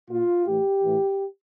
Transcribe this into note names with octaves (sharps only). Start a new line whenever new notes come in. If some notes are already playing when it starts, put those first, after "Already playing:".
A#2 F4
A2 E3 G4
A2 E3